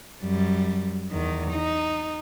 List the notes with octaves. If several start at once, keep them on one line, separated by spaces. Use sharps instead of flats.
F#2 G3
E2 D#3
D#4